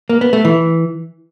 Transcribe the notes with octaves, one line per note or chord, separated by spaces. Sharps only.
A#3
B3
A3
E3